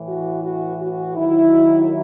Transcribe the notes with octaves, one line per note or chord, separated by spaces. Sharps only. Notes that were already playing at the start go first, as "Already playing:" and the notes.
Already playing: A2 E3
F#4
F#4
F#4
D#2 D#3 F#3 E4